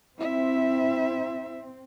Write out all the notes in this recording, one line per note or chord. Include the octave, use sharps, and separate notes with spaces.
C4 E4 E5